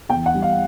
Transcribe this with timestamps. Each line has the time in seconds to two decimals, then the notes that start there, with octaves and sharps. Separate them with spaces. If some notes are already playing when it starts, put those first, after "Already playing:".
0.09 E2 G5
0.26 F#5
0.34 G3
0.42 F5